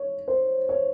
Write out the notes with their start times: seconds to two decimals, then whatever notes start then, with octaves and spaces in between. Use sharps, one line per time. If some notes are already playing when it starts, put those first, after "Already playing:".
Already playing: C#5
0.28 C5
0.69 C#5